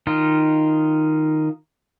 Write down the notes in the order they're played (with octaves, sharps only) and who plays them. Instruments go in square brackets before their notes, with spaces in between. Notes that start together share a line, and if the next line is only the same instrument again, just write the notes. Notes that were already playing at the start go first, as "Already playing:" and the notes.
[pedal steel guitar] D#3 D#4 F4